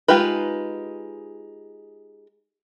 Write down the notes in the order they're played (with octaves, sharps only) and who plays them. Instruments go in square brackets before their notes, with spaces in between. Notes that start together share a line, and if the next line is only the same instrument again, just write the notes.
[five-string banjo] G#3 D#4 F4 G4 B4